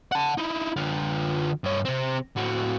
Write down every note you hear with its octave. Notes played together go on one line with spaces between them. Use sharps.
F#5 A5
D#4 E4
D3 F4
G2 C#5
C3 C4
A2 F#4